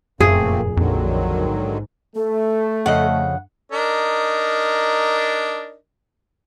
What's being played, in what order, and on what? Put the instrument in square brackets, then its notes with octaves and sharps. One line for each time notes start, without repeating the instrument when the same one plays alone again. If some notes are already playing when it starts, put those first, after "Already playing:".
[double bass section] F1 A#2 [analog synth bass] F#2 [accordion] A3 A#3 C4 [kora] G#4
[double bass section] A#1 [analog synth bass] F2 [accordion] D3 D#3 F#3
[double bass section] G#2
[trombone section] A3 [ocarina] A4
[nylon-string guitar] F2 C#3 D#5 [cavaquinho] F#5
[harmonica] D4 D#4 A#4